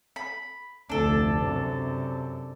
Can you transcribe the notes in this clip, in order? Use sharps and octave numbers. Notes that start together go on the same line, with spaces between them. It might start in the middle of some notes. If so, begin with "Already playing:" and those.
B5
F1 D2 D4 A4
F#2 C3